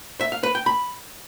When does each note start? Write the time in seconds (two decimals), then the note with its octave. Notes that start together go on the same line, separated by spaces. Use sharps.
0.21 E5
0.32 F5
0.43 B4
0.55 G5
0.66 B5